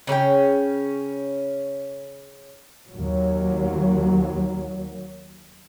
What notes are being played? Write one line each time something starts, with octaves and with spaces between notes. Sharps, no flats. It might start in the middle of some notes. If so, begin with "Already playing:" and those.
C#3 C#4 A4 G5
D#2 F#3